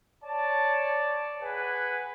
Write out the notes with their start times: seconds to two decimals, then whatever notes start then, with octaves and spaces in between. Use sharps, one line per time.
0.23 C#5 D5 A5
1.42 G#4 B4 F#5 G#5